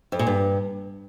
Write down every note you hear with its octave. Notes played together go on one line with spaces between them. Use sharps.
F2
A#2
G2